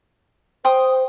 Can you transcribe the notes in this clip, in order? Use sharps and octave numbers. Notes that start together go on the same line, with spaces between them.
C5 G5 C6 D#6